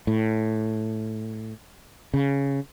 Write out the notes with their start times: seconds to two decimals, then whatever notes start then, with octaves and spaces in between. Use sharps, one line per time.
0.07 A2
2.14 C#3